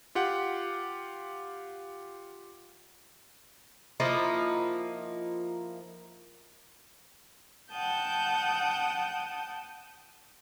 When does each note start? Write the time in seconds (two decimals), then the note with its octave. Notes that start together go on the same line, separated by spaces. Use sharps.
0.15 F4 G4 F#5
4.00 F3 A#3 D#4 E4
7.71 F#5 G5 A5 D#6 G6